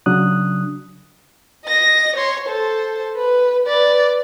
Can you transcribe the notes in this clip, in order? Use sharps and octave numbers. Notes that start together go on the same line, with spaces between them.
C#3 F#3 D4 D#6 F#6
D#5 A#6
C#5 C6
A4 C5
B4
B4 D5